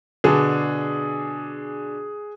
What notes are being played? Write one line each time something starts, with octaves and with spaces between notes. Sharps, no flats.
B2 D3 D4 G#4